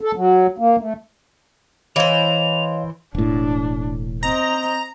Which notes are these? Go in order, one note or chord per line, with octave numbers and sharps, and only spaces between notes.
A4
F#3
A#3
A3
E3 C5 C#5 D#5 F5 F7
E1 A2 D4
C4 D#5 A#5